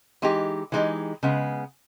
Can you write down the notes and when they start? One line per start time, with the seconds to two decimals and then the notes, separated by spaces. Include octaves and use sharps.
0.22 E3 G#3 D#4 G4
0.72 E3 G#3 D#4 G4
1.23 C#3 G#3 B3